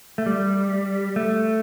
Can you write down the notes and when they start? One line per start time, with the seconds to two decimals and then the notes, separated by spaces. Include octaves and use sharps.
0.18 A3
0.26 G3
1.16 A3